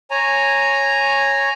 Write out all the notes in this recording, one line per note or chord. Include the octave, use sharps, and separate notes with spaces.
C#5 G#5 A#5